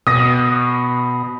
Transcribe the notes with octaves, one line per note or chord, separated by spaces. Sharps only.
B2 D#6 A#6